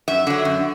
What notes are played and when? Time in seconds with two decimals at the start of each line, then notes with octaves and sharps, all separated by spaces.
0.08 F#2 E5
0.27 D3 F#3
0.45 F#2